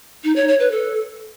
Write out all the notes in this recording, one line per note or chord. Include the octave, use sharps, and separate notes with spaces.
D#4
C#5
C#5
B4
A4